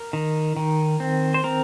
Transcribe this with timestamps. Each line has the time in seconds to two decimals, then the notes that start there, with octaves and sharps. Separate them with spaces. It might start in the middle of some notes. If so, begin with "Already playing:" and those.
Already playing: A#4
0.13 D#3
0.56 D#3
1.00 C4
1.34 C5
1.44 C4 A#4